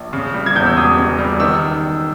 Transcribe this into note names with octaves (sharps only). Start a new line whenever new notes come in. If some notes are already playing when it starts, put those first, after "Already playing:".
Already playing: A#1
C#3
G3
G#6
E2 G6
E6
E1 D#6
C#3
G3
D#3 E6